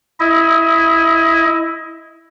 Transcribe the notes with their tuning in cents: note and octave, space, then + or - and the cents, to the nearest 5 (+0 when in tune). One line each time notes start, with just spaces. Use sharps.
E4 +0 D#5 +25